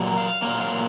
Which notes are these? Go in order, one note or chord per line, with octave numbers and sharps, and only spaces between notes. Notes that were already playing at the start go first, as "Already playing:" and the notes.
Already playing: A#2 F#3 A#3
F5
A#2 F#3 A#3 F5
F5